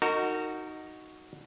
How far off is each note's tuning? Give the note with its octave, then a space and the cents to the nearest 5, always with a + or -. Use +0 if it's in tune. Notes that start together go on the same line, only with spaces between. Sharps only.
D#4 +0 F#4 +0 A#4 -30